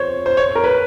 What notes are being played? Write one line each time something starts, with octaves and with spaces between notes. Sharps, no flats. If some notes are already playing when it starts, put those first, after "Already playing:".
Already playing: C5 C#5
C5
C#5
A#4
B4